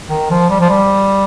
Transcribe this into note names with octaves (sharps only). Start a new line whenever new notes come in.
D#3
F3
G3
F3
G3